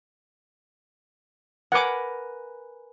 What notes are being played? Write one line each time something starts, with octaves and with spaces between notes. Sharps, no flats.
A#4 B4 F#5 G#5 D6